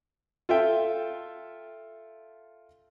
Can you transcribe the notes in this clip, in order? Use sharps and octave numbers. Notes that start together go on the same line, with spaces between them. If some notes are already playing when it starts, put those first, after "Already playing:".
F4 A4 E5 G5